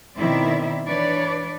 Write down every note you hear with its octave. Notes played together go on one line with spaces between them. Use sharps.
B2 D#3 C4 E4 D5 E5
E3 D4 B4 C#5 D5